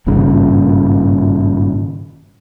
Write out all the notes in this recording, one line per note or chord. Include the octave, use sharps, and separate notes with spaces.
G#1 G2 A#2 C#3